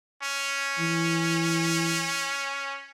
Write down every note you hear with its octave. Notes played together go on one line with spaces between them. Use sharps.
C#4
E3